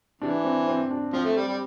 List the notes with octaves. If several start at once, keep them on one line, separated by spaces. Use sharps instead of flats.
C3 E3 D4
C4
C4
D4
F3 C4
A3
G3
G3